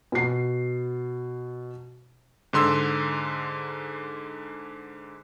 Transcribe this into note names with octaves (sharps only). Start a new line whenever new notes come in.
B2 C7
G#2 D3 C6 E6